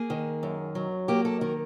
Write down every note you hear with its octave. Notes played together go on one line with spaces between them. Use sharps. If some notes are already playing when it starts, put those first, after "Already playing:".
Already playing: A#3 G#4
D#3
F#2
F#3
A#3 G4
A4
D#3 A#4